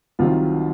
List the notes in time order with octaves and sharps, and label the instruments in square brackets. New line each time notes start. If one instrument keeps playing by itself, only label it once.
[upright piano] C2 C3 D#3 F#3 F4